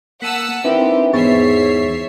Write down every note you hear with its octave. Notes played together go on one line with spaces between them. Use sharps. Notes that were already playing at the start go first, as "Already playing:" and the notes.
A#3 F#5 A5 E6 B6 D#7
E3 C4 D4 D#4 G4 A#4
E2 G#2 B3 C#5 E5 C#6 A6 C7